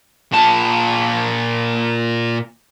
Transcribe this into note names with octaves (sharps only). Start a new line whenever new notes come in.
A#2 A5